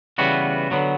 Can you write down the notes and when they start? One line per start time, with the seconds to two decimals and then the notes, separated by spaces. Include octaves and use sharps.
0.18 C#3 E3 G3 B3 F#4
0.71 D3 F#3 B3